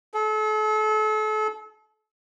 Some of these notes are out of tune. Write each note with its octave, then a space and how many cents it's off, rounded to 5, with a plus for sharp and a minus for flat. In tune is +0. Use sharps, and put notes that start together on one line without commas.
A4 -40